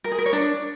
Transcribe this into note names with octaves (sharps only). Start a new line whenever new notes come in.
A#4
G#4
A#4
C#5
D4